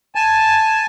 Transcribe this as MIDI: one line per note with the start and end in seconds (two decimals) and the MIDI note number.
0.15 0.86 80
0.15 0.86 81